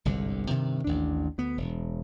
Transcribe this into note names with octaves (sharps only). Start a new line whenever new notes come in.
G1 C2 G#2 D3
G2 C3 D#3
A1 D#2 D4
D2 B3
E1